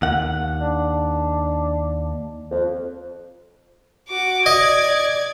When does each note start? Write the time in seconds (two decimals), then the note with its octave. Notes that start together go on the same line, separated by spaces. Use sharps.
0.02 D#2 F#5
0.61 D4
2.51 F2
4.09 F#4 D6
4.46 D5 D#5 G#6